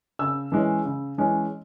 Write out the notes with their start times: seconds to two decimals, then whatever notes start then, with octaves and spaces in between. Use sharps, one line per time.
0.19 C#3 E6
0.52 E3 G#3 C#4
0.85 C#3
1.18 E3 G#3 C#4